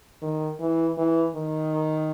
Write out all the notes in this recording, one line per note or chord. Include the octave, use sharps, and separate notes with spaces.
D#3
E3
E3
D#3